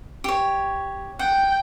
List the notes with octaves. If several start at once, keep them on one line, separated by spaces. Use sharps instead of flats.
G4 C#5
F#5 G5